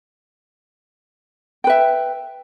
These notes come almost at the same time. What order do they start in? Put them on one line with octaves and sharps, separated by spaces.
G5 B4 E5